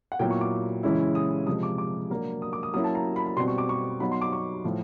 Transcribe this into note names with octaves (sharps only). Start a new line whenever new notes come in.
F#5
A#2 F#3 B3 E4 G5
C#6
D6
C#3 E3 G#3 C#4 E4
D#6
C3 F3 G#3 D#6
D6
D6
F#3 A#3 D4
D#6
D6
D#6
F#3 A#3 C#4 E4 D#6
A5
A#5
B5
B5
B2 G3 C4 C6
C#6
D6
C#6
F#3 B3 D#4 B5
C6
D6
C#6
A2 F3 A3